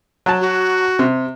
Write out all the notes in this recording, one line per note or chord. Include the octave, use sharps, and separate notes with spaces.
F#3 A5
F#4
C3